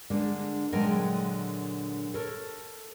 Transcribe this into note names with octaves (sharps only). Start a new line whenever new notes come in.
D3 G#3 A#3 D4
A#2 D3 F#3 G#3 A#4 G5
A4 A#4 C#5